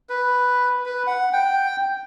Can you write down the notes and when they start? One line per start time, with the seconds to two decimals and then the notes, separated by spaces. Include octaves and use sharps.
0.09 B4
0.86 B4
1.07 F#5
1.33 G5